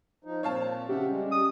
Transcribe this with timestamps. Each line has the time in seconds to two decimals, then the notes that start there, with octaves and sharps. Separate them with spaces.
0.25 F3 D#4
0.43 A#2 F3 C4 C#5 F5 A5
0.89 C#3 C#4 G4 E5 F#5
1.08 G3 G#3
1.32 D#6